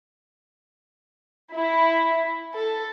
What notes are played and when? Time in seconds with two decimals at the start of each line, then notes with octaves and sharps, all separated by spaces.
1.53 E4
2.52 A4